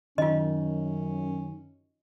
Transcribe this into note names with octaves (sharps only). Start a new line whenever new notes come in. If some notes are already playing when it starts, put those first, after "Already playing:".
F#2 D#3 C#4 F4 D#5